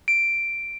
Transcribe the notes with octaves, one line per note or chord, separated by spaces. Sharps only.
D7